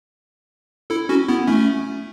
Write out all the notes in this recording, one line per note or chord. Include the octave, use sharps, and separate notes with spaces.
E4 A4
C#4 F#4
B3 E4
A3 C#4